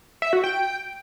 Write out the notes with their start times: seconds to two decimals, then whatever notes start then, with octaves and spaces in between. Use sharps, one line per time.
0.22 E5
0.33 F#4
0.44 G5